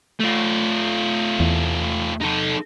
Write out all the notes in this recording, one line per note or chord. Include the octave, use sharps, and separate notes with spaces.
A3 F4
E2
D#4 A4